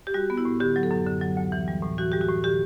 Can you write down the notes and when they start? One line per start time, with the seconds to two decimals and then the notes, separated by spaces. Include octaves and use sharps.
0.07 G4
0.14 G3 F#4
0.30 B3
0.38 E4
0.45 A2
0.60 D3 G4
0.76 F#3
0.83 A4
0.91 F#2
1.06 D3
1.21 F#3
1.37 D2
1.52 E3
1.68 G3
1.83 A2
1.98 E3 F#4
2.12 G3 G4
2.21 F#4
2.28 A2
2.44 D3 G4